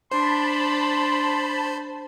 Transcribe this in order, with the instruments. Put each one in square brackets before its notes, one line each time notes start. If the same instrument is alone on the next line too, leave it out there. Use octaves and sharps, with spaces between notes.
[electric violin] D4 [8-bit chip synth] C5 [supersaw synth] A5 B5 [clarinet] C6